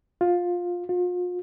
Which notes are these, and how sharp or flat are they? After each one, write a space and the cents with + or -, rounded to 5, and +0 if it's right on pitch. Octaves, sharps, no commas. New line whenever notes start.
F4 +15
F4 +40